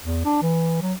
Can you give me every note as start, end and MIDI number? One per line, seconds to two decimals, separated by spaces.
0.03 0.23 40
0.25 0.41 62
0.42 0.77 52
0.82 0.94 54